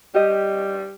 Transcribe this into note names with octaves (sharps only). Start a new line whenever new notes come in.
G3 G4 D#5